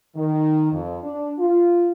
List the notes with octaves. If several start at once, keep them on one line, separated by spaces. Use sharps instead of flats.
D#3
F2
D4
F4